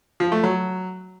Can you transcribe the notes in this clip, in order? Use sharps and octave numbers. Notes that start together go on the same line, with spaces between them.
F3
A3
F#3